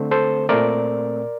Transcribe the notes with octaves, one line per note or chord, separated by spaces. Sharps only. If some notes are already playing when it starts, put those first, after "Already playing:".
Already playing: D3 A3 C4
A4 C5
A#2 A3 C4 A#4 D5